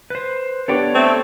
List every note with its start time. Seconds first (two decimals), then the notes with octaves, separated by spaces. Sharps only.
0.10 B4 C5
0.68 B3 D4 G4 A4 C#5 D5
0.95 A3 C4